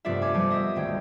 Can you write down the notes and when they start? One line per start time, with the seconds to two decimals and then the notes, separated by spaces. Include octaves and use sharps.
0.05 F1 G2 B3 F4 D5 E5
0.22 C#5 G#5 D6
0.34 F3 G3 G4
0.50 D#5 E5 D#6 E6
0.75 G#1 D2 G5 G#6